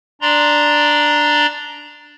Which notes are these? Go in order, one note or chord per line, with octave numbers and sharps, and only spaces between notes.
D4 D5 A#5 C6